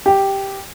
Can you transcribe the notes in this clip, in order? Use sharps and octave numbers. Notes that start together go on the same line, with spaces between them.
G4